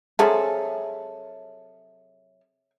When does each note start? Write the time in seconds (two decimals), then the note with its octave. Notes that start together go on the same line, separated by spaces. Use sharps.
0.19 C3 F3 F#3 G#4 A4